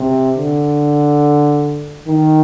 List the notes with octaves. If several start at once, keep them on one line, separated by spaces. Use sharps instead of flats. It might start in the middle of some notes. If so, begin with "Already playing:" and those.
Already playing: C3
D3
D#3